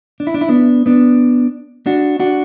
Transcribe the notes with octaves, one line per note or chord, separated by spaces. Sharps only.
D4
E4
D4
E4
B3 D4
B3 D4
D4 F#4
D4 F#4